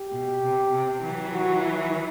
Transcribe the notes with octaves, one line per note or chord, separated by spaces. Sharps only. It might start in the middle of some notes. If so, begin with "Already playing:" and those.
Already playing: G4
B2
C3
C3
E3 F#3
F#4
E4